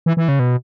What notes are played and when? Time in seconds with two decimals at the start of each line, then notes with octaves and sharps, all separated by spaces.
0.06 E3
0.17 E3
0.28 C#3
0.39 B2